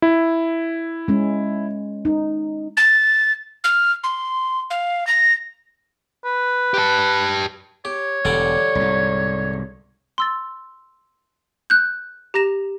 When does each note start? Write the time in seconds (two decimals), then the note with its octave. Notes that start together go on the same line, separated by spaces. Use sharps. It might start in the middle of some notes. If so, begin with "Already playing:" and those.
0.02 E4
1.08 G#3 C#4
2.05 D#4
2.77 A6
3.64 F6
4.04 C6
4.70 F5
5.07 A#6
6.25 B4
6.74 G4 A5
7.85 G4 C#5
8.25 E1 D3 G3 D5
8.75 C2 G#2
10.18 C6 E6 A6
11.70 F#6 G6
12.34 G4 A#5 A#6 E7